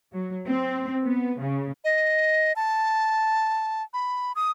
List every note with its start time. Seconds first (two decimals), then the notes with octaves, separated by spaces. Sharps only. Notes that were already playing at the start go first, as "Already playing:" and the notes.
0.13 F#3
0.48 C4
1.04 B3
1.41 C#3
1.84 D#5
2.56 A5
3.94 B5
4.36 D#6